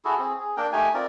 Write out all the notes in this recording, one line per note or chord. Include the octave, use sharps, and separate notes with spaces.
E4 F#4 G#4 A4
C4 G#4
G#4
A#3 D4 A#4 G5
A3 D#4 G4 G#5
C4 F4 A#4 D5